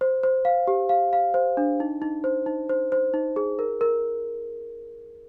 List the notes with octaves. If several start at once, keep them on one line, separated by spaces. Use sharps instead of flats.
C5
C5
F5
G4
F5
F5
C5
D4
D#4
D#4
C5
D#4
C5
C5
D#4
G#4
A#4
A#4